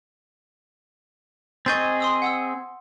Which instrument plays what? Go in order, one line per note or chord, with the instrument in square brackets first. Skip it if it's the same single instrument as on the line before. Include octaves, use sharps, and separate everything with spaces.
[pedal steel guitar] C4 G#4 D#5 [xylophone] C#6 G6 A6
[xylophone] C6 D#6 E6
F#5 D#6 E6